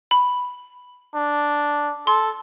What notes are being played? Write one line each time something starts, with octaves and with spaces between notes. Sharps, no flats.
B5
D4
A4 C6